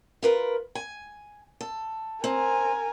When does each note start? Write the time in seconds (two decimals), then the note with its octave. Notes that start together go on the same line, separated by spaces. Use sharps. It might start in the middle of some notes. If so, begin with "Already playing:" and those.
0.23 F4 A#4 B4
0.75 G#5
1.61 A4
2.24 C4 A#4 G#5